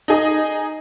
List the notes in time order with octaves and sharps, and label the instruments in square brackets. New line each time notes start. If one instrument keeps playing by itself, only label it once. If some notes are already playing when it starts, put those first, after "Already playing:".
[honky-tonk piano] D#4 G#4 D#5